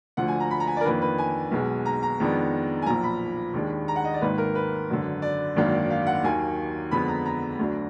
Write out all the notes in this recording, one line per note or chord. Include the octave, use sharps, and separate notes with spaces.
D2 D3 F3 F#5
G#5
A#5
B5
A#5
G#5
D5
A#4
F2 D#3 A#3 D4 B4
B4
G#5
B1 B2 G#3
A#5
A#5
F2 D#3 G#3 B3 D4
G#5
B1 A#2 F3 A#5
B5
D#2 D#3 G#3 D4
A#5
F#5
D#5
D5
G#1 G#2 D#3 A#3 B4
A#4
B4
G#1 F#2 D3
D5
G#1 F#2 D#3 A#3 D4
F5
F#5
D#2 D#3 F#3 A#3 G#5
F2 D3 G#3 B3 B5
A#5
A#5
D2 D3 F#3 D4